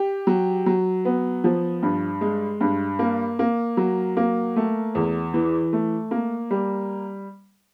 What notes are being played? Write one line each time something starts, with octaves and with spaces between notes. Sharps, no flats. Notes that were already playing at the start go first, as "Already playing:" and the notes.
Already playing: G4
F#3
F#3
B3
F3
G2
G#3
G2
A#3
A#3
F#3
A#3
A3
E2
E3
A3
A#3
G3